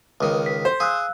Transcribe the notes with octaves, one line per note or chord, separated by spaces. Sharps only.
C#2 D#3 B4
B6
C5
G#4 F5 E6 F#6